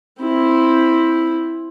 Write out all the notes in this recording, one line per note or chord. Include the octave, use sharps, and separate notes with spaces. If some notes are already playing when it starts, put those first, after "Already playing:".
C4 E4